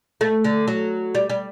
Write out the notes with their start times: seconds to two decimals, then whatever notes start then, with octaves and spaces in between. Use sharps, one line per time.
0.21 A3
0.44 D3
0.68 F#3
1.15 G3
1.30 G3